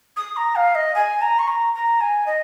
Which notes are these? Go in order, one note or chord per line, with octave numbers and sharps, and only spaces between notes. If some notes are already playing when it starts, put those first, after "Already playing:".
D#6
A#5
F5
D#5
G#5
A#5
C#6
A#5
A#5
G#5
D#5